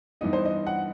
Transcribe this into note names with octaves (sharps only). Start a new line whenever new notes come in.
G2 E3 B3 D#4 D#5
C5
D#5
F#5